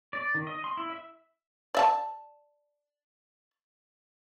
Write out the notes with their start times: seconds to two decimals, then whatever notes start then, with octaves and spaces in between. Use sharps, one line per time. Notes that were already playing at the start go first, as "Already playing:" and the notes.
0.13 D5
0.35 D#3
0.47 D#5
0.64 C6
0.77 E4
0.90 E5
1.75 D5 E5 A5